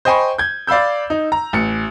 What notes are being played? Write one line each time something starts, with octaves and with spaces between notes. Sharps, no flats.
C5 D#5 G5 G#5 B5 C#6
G6 G#6
D5 F5 B5 E6 G6
D#4
A#5
A1 C#7